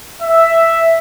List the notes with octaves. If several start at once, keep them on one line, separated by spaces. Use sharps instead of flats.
E5